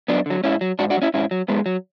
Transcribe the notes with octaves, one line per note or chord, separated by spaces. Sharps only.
F#2 B3 D4
D3 F#3
G#2 C#4 E4
F#3
G#2 D4 F#4
D4 F#4
F#3
C#4 E4
G#2 C#4 E4
F#3
G#2 G#3 B3
F#3